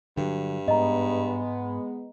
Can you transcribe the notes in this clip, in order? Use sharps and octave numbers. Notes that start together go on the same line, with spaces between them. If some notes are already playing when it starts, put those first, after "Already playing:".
G2 D3 F#3
G#2 G#3 B3 D#5 A#5